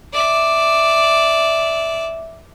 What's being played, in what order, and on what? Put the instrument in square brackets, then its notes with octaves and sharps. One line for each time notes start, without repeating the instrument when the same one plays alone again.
[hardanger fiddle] D5 E5